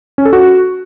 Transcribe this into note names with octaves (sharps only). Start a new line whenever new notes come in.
C#4
A4
F#4